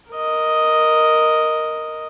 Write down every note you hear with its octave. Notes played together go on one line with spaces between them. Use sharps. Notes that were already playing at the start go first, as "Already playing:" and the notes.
A#4 D#5